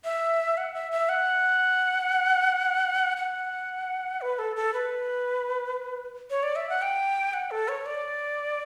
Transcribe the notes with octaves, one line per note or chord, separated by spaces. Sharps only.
E5
F#5
E5
E5
F#5
F#5
B4
A4
A4
B4
C#5
D5
E5
F#5
G5
F#5
A4
C#5
D5